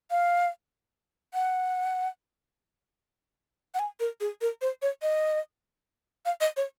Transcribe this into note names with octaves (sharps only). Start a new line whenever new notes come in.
F5
F#5
F#5
G#5
A#4
G#4
A#4
C5
C#5
D#5
F5
D#5
C#5